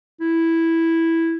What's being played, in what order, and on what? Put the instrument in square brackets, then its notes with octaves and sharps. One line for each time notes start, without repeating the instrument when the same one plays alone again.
[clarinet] E4